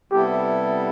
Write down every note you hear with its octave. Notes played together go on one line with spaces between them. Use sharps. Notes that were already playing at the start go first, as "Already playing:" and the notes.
C3 G3 B3 E4 G4 A4